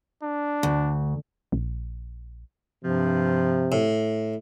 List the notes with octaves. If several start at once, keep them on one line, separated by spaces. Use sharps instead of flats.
D4
D2
A#1
G2 C3 F3
A2